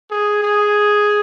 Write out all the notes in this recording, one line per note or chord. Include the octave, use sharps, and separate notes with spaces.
G#4
G#4